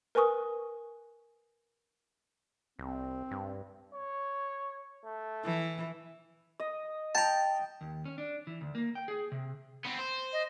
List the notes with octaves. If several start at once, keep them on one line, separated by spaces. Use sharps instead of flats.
A#4 B4 G#5 C#6 D#6
C2 C4
G2
C#5
A3
E3
D#5
G5 A5 A#5
D#2
C#4
D4
E3
D2
A#3
G5
G#4
C3
B3 C4
C5
D#5